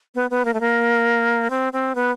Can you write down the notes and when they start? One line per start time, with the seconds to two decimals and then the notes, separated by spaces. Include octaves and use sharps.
0.15 B3
0.31 B3
0.45 A#3
0.54 A3
0.60 A#3
1.50 C4
1.73 C4
1.95 B3